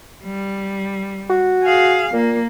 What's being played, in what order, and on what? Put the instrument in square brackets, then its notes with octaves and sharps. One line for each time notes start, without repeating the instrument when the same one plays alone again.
[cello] G3
[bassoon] F#4
[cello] G#4 F5
[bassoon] A#2 [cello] A#3